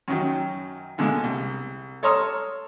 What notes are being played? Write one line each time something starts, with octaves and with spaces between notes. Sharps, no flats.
F#2 D#3 F#3
B2 D3 G#3 A#3
C2
A4 C#5 A#5 C6 D#6 F6